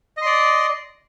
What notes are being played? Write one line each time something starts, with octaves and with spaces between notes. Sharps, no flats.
D5 D#5 C6